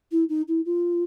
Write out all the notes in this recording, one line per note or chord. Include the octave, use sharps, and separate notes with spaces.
E4
D#4
E4
F4